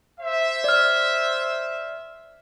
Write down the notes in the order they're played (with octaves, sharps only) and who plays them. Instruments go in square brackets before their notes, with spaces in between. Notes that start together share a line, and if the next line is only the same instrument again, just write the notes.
[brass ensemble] C5 E5
[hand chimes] D5 F6